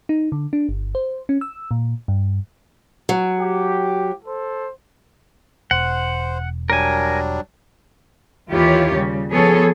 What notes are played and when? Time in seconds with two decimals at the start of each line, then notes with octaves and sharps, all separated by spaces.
0.09 D#4
0.32 D3
0.53 D4
0.69 G1
0.95 C5
1.29 C#4
1.41 E6
1.71 A#2
2.08 G2
3.09 F#3
3.40 G4
4.25 A4 C5
5.71 E1 C5 F#5
6.70 F#3 G3 D4 A#4 G#5
8.50 D#2 E3 E4 F4 G4 C#5
8.92 C#3 G3
9.32 F3 B3 G#4 A4 C#5